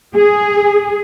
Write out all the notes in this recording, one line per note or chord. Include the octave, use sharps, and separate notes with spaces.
G#4